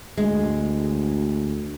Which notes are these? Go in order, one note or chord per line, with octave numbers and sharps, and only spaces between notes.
D2 G#3